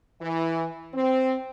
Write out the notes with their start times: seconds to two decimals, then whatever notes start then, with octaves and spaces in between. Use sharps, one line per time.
0.21 E3
0.94 C4